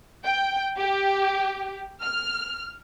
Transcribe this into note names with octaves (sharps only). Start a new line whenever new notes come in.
G5
G4
F6